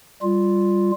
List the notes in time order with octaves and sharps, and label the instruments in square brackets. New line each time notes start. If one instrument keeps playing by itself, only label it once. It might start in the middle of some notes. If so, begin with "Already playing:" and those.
[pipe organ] G3 F4